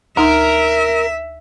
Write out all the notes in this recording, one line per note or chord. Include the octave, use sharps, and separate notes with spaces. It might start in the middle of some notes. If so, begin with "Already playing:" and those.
D2 D#4 A#4 E5 C6